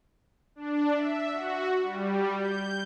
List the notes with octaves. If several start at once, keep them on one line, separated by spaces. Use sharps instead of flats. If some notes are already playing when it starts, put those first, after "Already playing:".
D4
E5
F#4
G3
G6